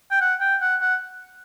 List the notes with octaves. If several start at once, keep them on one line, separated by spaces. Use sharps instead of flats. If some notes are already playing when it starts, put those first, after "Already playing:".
G5
F#5
G5
F#5
F#5